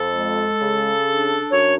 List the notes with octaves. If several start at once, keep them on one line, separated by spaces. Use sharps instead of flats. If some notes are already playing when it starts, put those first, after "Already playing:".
Already playing: F2 A4
G#3
C#3
D4
F#2 C#5